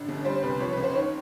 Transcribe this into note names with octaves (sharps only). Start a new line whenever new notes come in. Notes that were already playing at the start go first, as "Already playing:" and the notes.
Already playing: A1 D3
G1
G3 C5
C2 B4
F3 C#5
C#2 B4
C5
D#3 C#5